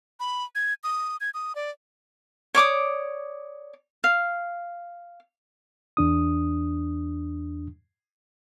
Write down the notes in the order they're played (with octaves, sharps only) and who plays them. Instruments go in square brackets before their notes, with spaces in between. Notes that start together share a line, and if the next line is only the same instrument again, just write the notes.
[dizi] B5
G#6
D#6
G#6
D#6
D5
[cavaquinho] C#5 D5 D6 D#6
F5
[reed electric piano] E2 D4 D#6